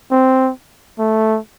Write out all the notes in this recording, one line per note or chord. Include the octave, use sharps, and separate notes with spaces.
C4
A3